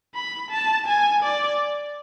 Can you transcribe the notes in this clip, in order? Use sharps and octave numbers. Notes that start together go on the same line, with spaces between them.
B5
A5
G#5
D5